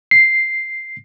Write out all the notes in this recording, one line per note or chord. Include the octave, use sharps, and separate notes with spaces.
C7